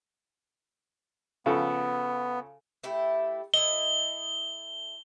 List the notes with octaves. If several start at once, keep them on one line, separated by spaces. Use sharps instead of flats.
C#3 F3 B3 A4
A3 E4 G4
E4 A4 D#5 G7